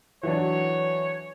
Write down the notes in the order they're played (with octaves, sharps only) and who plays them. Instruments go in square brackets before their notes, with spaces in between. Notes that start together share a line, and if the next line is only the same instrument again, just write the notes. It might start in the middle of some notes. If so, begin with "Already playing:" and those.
[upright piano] E3 F#3 D4 [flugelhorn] C#5